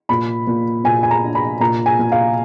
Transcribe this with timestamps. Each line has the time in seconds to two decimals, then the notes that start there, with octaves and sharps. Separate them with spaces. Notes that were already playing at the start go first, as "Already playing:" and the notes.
0.09 A#2 B5
0.47 A#2
0.84 A#2 G#5
1.03 G#5
1.11 A#5
1.23 D4
1.35 B5
1.60 A#2 A#5
1.86 G#5
1.99 A#2
2.12 F5